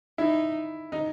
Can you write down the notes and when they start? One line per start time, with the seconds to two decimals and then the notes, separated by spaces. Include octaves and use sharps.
0.18 D#4 E4
0.92 D#4